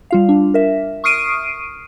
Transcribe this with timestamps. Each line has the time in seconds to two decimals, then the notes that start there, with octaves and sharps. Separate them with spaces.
0.11 G3 F4 F5
0.29 D4
0.54 A#4 E5
1.04 C#6 D#6 F6 C7 D7 D#7